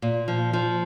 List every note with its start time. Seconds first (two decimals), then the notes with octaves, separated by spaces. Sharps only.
0.02 A#2
0.28 F3
0.53 F3